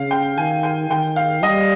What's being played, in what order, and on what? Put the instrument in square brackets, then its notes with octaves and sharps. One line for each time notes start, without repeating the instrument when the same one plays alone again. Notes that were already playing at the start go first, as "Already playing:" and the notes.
Already playing: [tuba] C#3 [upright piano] F5
[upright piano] G5
[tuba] D#3 [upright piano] G#5
[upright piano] G5
[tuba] D#3 [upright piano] G5
[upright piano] F5
[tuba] G3 [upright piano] D#5